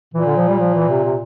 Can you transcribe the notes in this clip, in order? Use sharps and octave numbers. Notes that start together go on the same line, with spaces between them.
A#2 E3
D3
F3
G3
F3
E3
C3
C3